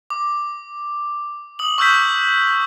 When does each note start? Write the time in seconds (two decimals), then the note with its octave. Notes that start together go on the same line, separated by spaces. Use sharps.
0.10 D6
1.59 D#6 F#7
1.78 C#6 E6 F#6 G6 B6